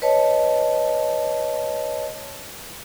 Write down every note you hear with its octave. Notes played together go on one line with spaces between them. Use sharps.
B4 C#5 D#5 A5